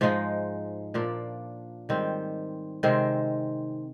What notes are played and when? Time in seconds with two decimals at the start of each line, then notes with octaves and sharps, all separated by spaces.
0.01 G#2 F3 G#3 D#4
0.94 A#2 F3 A#3 D4
1.89 G#2 D#3 G3 C4
2.83 C3 D#3 G#3 C4